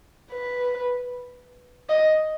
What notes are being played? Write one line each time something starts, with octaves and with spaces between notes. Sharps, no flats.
B4
D#5